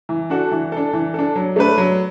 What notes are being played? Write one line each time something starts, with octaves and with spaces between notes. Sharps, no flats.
E3
D4 F#4 A4
E3
D4 A4
E3
D4 A4
F#3
A3 D4 B4
F#3